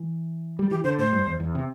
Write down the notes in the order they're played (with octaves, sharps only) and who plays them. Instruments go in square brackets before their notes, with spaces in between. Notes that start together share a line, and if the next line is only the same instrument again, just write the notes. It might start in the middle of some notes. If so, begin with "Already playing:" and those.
Already playing: [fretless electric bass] E3
G3
[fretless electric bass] E3 [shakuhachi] G4
[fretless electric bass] D3 [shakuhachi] C5
[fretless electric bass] A2 [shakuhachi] C5
[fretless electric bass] G2
E2
E2
C3